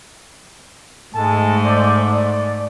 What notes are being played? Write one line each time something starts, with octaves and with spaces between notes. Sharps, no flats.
G#2 G#3 A3 A4 A5
C5 D5
D5